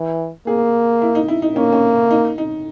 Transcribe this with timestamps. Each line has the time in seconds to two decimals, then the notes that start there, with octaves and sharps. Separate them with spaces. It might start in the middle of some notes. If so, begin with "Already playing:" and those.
Already playing: E3
0.47 A#3 G#4
1.02 E4
1.15 D#4
1.28 E4
1.42 D#4
1.56 A#3 C#4
1.73 C#4
2.11 D#4
2.38 D#4